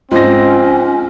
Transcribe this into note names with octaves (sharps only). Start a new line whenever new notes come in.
G#2 F3 C4 C#4 F4 A#6